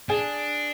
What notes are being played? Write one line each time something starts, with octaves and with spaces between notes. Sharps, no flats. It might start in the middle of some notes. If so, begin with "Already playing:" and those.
D4 G#4